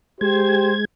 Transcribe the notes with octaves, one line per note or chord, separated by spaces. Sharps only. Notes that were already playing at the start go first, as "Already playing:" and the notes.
G#3 G4 C5 G#6